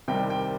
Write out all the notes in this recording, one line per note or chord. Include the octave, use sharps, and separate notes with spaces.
C2 C3 D#3 G3 C4 G5
G5